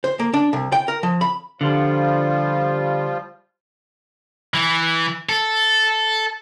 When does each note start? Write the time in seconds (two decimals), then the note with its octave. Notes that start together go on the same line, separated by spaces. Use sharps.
0.04 C5
0.19 A#3
0.33 D4
0.53 C2
0.72 G5
0.88 A#4
1.03 F3
1.21 B5
1.61 D3 F3 G3 F4
4.54 E3
5.29 A4